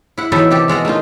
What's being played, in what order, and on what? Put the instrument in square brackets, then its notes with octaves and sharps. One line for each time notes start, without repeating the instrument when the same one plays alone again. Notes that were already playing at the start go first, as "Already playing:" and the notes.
[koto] E4 F#5
E3 F#3 B3 D#4 E4 A4
C3 G4 A4
B2 G#3 A4 A#5
A3 A#3 D#4 F4